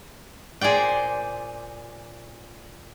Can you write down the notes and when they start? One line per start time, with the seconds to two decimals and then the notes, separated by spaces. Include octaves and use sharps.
0.61 A#2 G#4 C5 D5 G5